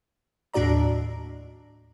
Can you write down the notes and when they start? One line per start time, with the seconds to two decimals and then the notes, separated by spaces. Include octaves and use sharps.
0.54 D#2 A2 D4 F#4 D5 A#5